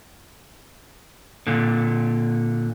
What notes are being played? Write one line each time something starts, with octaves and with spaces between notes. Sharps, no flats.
A#2 D3